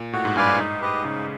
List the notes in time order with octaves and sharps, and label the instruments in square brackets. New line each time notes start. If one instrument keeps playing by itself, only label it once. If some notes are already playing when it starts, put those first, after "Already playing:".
Already playing: [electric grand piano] A#2
[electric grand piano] A2 [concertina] F#4
[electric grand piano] G#2
[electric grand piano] G2 [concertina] B4 D5 F5 G#5
[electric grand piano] G2
[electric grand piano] G#2 [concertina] D#4
[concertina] G4 B4 D#5
[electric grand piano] C#3 [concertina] D#4